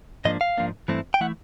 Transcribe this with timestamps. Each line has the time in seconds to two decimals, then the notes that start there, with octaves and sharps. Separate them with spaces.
0.25 G#2 F3 A#3 D4 D#5
0.41 F5
0.57 G#2 F3 A#3 D4
0.88 G2 E3 A3 C4 E4
1.14 G5
1.21 E3 A3 E4 F#5